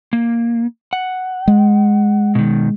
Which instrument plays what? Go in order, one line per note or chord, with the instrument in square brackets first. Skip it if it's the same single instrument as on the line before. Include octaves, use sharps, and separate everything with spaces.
[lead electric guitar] A#3
F#5
[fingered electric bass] G#3
[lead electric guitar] B2 D#3